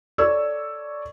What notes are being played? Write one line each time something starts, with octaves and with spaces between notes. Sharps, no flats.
A4 C#5 D5 C#6 E6 G#6